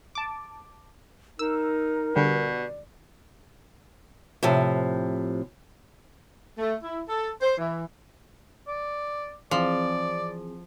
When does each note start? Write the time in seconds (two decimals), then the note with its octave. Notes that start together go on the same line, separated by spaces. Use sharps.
0.15 A5 D6
1.39 D#4 A#4 E6
2.16 B2 D3 G3 D5
4.43 A2 C3 F3
6.58 A3
6.83 E4
7.07 A4
7.41 C5
7.58 E3
8.67 D5
9.51 E3 F3 C4 G#4 D5